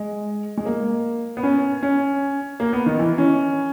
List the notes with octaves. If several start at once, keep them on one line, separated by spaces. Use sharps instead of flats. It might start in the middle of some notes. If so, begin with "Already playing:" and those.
Already playing: G#3
G#3
A#3
B3
C#4
C#4
A#3
B3
D#3
E3
C#4